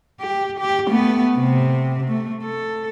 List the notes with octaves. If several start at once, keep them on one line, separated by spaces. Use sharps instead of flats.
G4
G4
A3 B3
C3
A3
A4